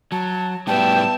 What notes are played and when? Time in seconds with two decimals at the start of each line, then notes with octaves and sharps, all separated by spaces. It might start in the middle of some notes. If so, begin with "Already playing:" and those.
0.12 F#3 A5
0.67 A2 G3 B3 E5 G5 A5